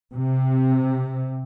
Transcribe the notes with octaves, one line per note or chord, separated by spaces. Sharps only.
C3